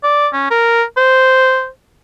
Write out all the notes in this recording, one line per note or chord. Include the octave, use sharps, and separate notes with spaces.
D5
C#4
A#4
C5